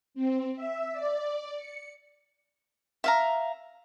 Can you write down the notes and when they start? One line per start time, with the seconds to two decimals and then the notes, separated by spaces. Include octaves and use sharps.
0.14 C4
0.56 E5
0.92 D5
1.57 C#7
3.04 E5 F5 A#5